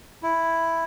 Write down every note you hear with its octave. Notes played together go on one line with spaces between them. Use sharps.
E4